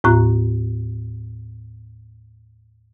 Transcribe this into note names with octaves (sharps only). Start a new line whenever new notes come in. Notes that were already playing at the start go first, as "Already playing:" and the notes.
D#2 A2 F4 A#5 C#6 F#6